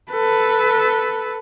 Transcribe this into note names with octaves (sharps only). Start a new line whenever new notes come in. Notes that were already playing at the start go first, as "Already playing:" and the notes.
A4 B4